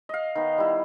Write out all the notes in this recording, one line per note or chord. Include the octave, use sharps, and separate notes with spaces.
D#5 F5
D#3 B3
G3 E4